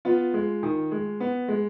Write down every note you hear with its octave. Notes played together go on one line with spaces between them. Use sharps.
B3 F4
G#3
D#3
G#3
B3
G#3